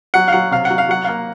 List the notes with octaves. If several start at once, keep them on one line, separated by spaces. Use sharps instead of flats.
F#3 F#5
F5
F#3 F#5
C3 F5
F#5
F#3
F5
F#3 F#5
A#3 F5